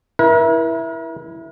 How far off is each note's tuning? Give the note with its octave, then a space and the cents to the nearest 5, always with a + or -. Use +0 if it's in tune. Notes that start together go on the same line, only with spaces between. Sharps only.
E4 +0 A#4 +45